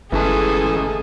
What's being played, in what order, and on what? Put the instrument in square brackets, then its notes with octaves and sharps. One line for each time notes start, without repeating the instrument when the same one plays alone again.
[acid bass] G1 [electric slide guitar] A2 C#4 A5 [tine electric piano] E3 G#3 [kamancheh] G#4 A4